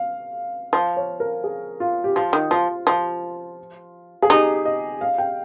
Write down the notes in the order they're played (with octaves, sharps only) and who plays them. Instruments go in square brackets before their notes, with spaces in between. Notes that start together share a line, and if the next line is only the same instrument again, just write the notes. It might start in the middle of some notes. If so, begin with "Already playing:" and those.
Already playing: [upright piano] F5
[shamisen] F3 [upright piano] F5
[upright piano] C#5
A#4
G#4
F4
G4
[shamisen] F3 [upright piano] F4
[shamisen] D#3
[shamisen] F3 [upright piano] F4
[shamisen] F3 [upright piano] F4
[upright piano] G#4
[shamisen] D#4 [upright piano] G4
[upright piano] D#5
F5
G5